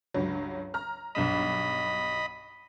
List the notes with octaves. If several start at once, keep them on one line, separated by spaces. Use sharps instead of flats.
C#2 G2 F#3
A#5 F6
B1 G2 D#5 B5 E7